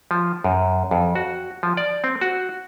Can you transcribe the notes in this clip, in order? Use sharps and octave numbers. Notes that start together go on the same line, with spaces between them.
F3
F#2
F2
F#4
F3
D5
C4
F#4